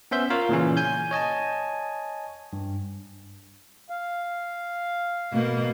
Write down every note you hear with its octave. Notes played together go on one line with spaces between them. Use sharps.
B3 C#4 C5 E5 G6
F4 A#4 C#5 F5
A#2 C#3 E3 C#4
G#5 G6
C#5 D#5 G#5 A5
G2
F5
B2 A#3